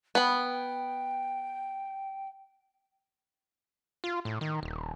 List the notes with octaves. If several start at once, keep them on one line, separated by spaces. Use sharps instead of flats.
B3 G5 B5
F4
A2
D#3
D#1